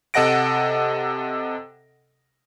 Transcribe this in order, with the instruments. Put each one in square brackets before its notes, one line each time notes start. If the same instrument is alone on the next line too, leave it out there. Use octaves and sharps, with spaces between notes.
[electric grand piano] C3 A4 D#5 F#5 A#6 D7